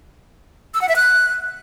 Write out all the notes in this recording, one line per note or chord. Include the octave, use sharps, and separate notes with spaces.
E6
F#5
E5
F#6